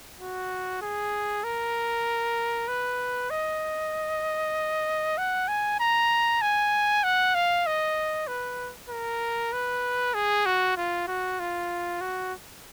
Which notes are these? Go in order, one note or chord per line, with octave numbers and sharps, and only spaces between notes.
F#4
G#4
A#4
B4
D#5
F#5
G#5
A#5
G#5
F#5
F5
D#5
B4
A#4
B4
G#4
F#4
F4
F#4
F4
F#4